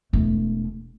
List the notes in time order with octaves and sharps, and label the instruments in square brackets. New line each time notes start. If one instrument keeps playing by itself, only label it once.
[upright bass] E1 A3